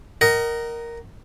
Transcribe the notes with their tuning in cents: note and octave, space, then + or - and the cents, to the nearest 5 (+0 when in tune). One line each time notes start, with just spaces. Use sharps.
A#4 +0 D#5 +0 F#5 +35